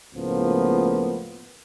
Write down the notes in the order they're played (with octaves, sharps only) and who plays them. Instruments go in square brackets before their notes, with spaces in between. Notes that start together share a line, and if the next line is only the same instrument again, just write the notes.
[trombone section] C#2 A2 F3 A#3 B3